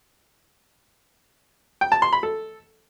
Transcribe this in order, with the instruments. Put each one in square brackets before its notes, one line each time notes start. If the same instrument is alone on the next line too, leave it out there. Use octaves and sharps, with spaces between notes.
[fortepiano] G5
A5
C6
B5
A4